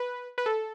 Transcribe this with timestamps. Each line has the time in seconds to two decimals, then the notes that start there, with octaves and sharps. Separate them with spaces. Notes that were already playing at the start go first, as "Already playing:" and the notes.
Already playing: B4
0.38 B4
0.46 A4